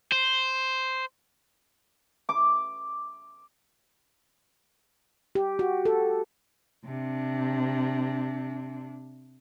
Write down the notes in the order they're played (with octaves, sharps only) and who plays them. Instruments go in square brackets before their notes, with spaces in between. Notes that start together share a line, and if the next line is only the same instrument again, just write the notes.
[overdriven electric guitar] C5
[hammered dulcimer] D6
[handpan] G4
F#4
A4
[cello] C3 D4